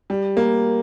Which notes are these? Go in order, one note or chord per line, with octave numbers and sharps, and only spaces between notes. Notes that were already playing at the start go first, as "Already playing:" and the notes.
G3
A#3